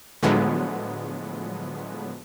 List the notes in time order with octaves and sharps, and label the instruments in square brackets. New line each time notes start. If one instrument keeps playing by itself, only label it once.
[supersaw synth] A2 D3 F3 F#3 G#3 B3